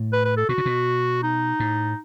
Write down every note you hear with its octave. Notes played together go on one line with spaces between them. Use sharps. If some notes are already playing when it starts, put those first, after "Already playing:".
Already playing: A2
B4
B4
A4
B2 F#4
C#3
B2
D#4
A2